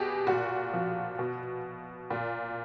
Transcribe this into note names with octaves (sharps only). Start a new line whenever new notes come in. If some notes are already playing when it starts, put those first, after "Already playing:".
Already playing: B2 G4 G#4
A#2 F#4
F3
B2
A#2